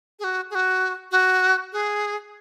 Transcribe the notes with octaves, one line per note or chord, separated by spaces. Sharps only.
G#4
F#4
G#4
F#4
F#4
G#4